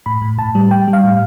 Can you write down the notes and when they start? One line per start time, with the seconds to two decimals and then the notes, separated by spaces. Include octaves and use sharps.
0.06 A2 B5
0.22 A2
0.38 A2 A5
0.55 G3
0.71 G3 G5
0.88 G3
0.93 F5
1.04 A2